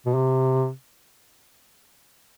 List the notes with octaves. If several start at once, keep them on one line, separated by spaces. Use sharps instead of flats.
B2
C3